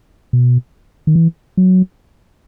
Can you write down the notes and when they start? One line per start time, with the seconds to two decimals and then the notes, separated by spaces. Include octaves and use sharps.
0.33 B2
1.07 D#3
1.15 E3
1.57 F#3